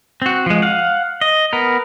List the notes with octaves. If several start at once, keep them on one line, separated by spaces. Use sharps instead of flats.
C4 F#4
F3 G#3
F5 F#5
D#5
B3 A#4